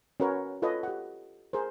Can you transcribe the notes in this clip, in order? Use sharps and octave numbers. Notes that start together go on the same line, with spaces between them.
C#4 F#4 A#4 B4 C#5
F4 A4 B4 C#5 D#5
G4 F#5
G#4 A#4 C5